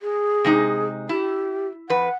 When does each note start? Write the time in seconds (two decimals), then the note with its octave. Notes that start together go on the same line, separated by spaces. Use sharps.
0.01 G#4
0.44 C3 G#3 D#4
1.09 E4 G4
1.90 F2 B4 F#5